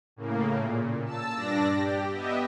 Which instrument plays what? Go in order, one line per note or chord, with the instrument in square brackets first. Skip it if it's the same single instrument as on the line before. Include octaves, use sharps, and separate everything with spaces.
[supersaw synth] A2 C#3 A#3
A#2
A5 E6
G2 D4 D5 A#6
G4
B3 G4 D#5 E5